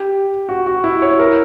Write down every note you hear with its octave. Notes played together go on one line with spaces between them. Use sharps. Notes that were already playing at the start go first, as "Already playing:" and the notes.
Already playing: G4
F#4
F#4
E4
C#5
A#4